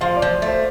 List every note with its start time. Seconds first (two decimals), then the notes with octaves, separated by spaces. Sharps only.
0.01 F3 F5
0.17 D5
0.22 F3
0.42 A3
0.48 C5